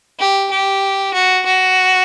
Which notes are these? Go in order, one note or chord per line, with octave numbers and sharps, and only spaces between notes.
G4
G4
F#4
F#4